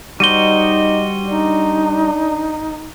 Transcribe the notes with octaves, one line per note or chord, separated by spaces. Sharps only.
G3 D#4 F#4 C5 D#7 G7
D4 D#4